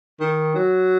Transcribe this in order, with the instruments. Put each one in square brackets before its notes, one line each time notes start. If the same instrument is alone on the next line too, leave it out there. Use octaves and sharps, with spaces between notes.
[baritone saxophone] D#3
F#3